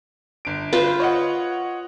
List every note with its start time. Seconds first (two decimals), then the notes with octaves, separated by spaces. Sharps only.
0.45 G1 D7
0.73 F4 B4 C5
1.00 C#5 D#5 F#5